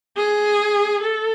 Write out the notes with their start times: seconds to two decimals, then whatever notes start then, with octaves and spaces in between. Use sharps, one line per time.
0.17 G#4
1.02 A4